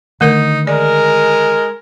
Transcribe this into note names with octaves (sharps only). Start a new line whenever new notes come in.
D3 D#3 A3 D#4 A#4
G#3 A#4 D5